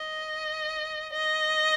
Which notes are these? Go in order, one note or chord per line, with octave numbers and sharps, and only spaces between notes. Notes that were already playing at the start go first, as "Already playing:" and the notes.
Already playing: D#5
D#5